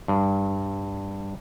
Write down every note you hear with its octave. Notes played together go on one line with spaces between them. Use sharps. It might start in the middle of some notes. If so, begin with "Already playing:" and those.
G2